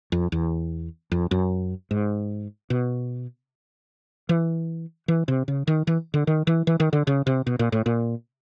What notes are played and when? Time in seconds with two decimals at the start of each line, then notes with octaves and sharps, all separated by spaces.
0.12 F2
0.32 E2
1.11 F2
1.31 F#2
1.91 G#2
2.70 B2
4.29 E3
5.08 E3
5.28 C3
5.48 C#3
5.67 D#3
5.87 E3
6.14 D3
6.27 D#3
6.47 E3
6.67 E3
6.80 D#3
6.93 D3
7.07 C#3
7.26 C3
7.47 B2
7.59 A#2
7.72 A2
7.86 A#2